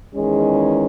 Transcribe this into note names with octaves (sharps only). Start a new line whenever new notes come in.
E2 D#3 G#3 C#4